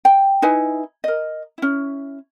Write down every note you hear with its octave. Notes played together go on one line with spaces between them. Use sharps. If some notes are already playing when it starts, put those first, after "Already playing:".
G5
D#4 E4 B4 G#5
A#4 D#5
C#4 E4